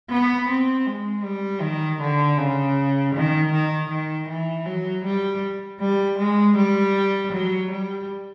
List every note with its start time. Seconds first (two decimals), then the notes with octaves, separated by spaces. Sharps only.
0.10 B3
0.49 C4
0.87 G#3
1.24 G3
1.62 D#3
2.01 D3
2.38 C#3
3.15 D#3
3.52 D#3
3.90 D#3
4.29 E3
4.66 F#3
5.05 G3
5.80 G3
6.19 G#3
6.57 G3
7.33 F#3
7.71 G3